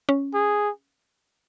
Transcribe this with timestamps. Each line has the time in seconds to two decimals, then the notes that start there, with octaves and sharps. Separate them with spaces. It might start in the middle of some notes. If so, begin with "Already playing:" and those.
0.09 C#4
0.34 G#4